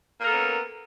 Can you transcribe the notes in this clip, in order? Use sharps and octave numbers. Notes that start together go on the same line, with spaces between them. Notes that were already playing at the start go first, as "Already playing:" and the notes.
A#3 B3 C#4 A4 A#4